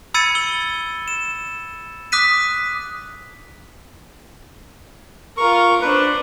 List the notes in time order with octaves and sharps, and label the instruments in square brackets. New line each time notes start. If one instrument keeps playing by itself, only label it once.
[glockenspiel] B5 E6 G#6 A6 C#7 D#7
E6 G7
E7
D6 D#6 F#6 B6 D#7
[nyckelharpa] F4 A#4 [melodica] C#6
[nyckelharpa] D4 C5 [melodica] B4